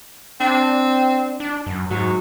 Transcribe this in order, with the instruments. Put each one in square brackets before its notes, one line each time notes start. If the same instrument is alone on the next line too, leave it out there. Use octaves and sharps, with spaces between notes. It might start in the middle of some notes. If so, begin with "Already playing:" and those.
[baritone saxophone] C4 [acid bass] D4
[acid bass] D4
F#2
[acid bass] G#2 [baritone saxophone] F#3